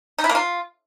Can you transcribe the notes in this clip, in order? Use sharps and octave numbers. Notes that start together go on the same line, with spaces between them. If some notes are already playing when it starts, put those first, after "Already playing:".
D#4
E4
A#3
F4